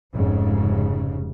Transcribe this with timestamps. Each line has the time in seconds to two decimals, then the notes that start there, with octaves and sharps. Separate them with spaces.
0.14 F1 G#2 C#3